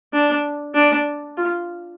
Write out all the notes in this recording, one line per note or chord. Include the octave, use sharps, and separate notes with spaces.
D4
D4
F4